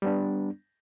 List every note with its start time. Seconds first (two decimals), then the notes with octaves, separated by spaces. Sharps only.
0.02 G3 B3 D4